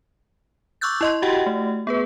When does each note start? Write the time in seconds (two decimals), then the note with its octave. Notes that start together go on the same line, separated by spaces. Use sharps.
0.81 C#6 D6 E6 F#6 G6 A6
1.01 E4 D#5 C6
1.22 F#4 G4 D#5 F#5 G5
1.46 A3
1.87 B3 G#4 B4